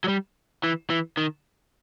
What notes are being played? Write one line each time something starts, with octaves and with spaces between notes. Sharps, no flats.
F#3
G3
E3
E3
D#3